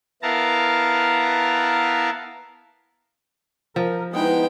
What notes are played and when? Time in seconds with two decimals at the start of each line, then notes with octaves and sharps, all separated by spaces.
0.23 B3 E4 A#4 F5 A5 A#5
3.76 F3 A#4
4.13 G#3 B3 D#4 E4 G5